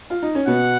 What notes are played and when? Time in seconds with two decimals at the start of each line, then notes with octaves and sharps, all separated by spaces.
0.10 F4
0.23 D#4
0.35 C#4
0.47 B2 B3 F#5